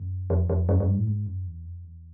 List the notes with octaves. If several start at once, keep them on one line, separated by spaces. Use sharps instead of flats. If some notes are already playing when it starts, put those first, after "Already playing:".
Already playing: F#2
F2
F2
F#2
F#2
G2
A2
G#2
F#2
E2
F2
E2